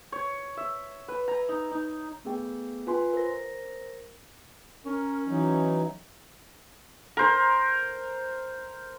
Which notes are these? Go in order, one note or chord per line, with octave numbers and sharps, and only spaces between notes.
C#5
E5
B4
A#5
D#4
D#4
A3 B3 G#4 G5
F4 B4 G#5 C6
A#4 C5 A#6
C#4 A#4
E3 F#3 D#4
A#4 C5